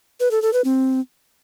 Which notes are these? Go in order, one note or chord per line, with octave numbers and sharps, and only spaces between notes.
B4
A4
A4
B4
C4